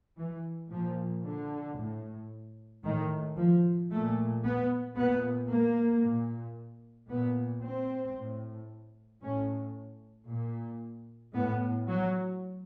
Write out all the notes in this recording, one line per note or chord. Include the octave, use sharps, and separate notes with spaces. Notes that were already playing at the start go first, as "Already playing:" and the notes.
E3
A#2 F3
D3
A2
A2 D#3
F3
A#2 A3
B3
A#2 B3
A#3
A#2
A#2 B3
C4
A2
A2 C#4
A#2
A2 B3
F#3